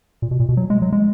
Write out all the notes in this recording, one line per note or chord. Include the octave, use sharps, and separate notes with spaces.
A#2
B2
A#2
B2
F#3
G#3
F#3
G#3